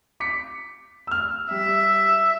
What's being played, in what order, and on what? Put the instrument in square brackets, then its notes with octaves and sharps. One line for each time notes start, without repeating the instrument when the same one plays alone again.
[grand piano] D6 B6 C#7
E6 F6
[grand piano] G3 [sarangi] E5